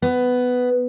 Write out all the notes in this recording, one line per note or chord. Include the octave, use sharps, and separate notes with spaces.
B3